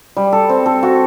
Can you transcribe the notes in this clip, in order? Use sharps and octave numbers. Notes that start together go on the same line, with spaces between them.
G3
A4
C4
A4
F#4